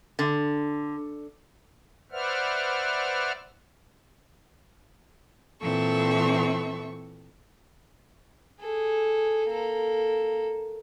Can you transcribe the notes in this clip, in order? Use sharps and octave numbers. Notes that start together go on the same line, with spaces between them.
D3
B4 C5 D5 E5 F#5 F6
A#2 E3 C4 A4 E5 C#6
G#4 A4
A#3 A4